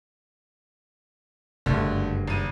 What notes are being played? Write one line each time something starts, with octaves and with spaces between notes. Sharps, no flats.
F#1 G2 D3 A3
G#1 D#7